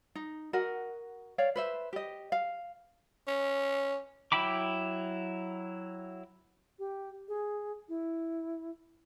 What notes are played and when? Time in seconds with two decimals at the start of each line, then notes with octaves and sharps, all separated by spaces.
0.15 D#4
0.53 F#4 A#4 D#5 F#5
1.38 C#5 D5 F5
1.56 B4 C5 E5
1.93 G4 D#5
2.32 F5
3.28 C#4
4.32 F#3 E4 G5 B5 D6
6.79 G4
7.28 G#4
7.89 E4